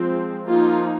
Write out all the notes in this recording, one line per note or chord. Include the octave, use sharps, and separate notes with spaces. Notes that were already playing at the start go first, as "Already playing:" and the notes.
Already playing: F3 G#3 C4
F3 A#3 D#4 F4